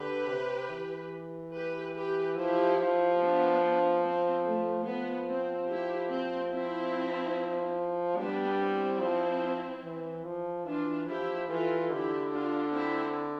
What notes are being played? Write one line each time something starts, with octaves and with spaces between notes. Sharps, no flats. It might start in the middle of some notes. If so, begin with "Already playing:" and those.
Already playing: D3 G4 B4
C3
E3
G4 B4
G4 B4
F3 E4 G4
F3
B3 D4
C4
A3
F3 B3
C4
E4 G4
C4
C4 E4
G3 B3 D4
C4 E4
F3
E3
F3
E3 D4 F4
F3 E4 G4
E3 F4 A4
D3 E4 G4
D4 F4
C4 E4